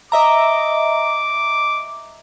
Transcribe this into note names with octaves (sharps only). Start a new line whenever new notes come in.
D#5 E5 A#5 D6